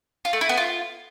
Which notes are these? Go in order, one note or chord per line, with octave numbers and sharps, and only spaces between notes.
F4
A3
E4
B3
F4